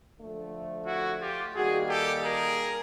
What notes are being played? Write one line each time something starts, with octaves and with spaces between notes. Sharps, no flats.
D3 F3 A3
E4 F#4
F4 G4
D#3 G3 A#3 F#4 G#4
G4 A4
G#4 A#4